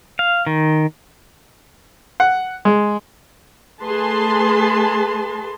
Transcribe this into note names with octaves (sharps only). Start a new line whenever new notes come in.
F5
D#3
F#5
G#3
A3 G#4 B4 A5 C6